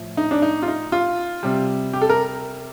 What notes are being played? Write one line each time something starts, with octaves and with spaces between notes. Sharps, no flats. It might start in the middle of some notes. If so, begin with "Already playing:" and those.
Already playing: A2 F3
D#4
D4
D#4
F4
D#4
F4
C3 G3
G4
A4
A#4